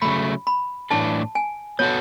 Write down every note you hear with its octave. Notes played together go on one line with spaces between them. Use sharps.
C#3 F#3 A3 B5
B5
A2 E3 A3 D4 A4 A5
G#5
B3 F#4 A4 C#5